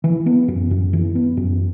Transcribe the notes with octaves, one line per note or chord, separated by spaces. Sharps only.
E3
B3
F#2
F#2
E3
B3
F#2